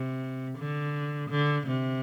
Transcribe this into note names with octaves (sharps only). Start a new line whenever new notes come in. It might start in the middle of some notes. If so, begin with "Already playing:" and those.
Already playing: C3
D3
D3
C3